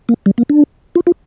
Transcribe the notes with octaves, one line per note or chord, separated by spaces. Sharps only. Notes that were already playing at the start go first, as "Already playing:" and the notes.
A#3
G3
A#3
D4
F4
F4